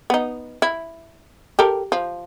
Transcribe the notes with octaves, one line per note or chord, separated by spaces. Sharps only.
B3 D#4
E4
G4 A4 A#4
F3